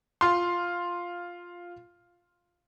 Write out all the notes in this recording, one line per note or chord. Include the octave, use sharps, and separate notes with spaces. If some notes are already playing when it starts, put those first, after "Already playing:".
F4 C6